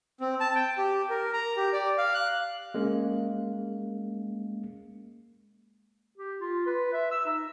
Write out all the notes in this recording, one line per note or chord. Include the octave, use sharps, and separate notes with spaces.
C4
A5
G5
G4
A#4
A#5
G4
D5
F5
F#6
G#3 A#3 C#4
G4
F4
B4
E5
E6
D#4